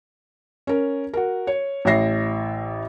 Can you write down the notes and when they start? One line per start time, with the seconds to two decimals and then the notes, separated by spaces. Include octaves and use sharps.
0.67 C#4 A#4
1.13 F#4 A#4
1.47 C#5
1.85 A1 E4 C#5 E5 A#6 C7